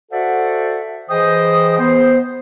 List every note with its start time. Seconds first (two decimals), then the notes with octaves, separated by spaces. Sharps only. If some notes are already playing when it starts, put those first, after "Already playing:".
0.12 F#4 A4 C5 D5 E5 F#5
1.10 E3 G#4 C5 D#5 G5 D#6
1.79 B3 C5